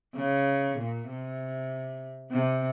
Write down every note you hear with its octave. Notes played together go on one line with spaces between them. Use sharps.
C#3
A#2
C3
C3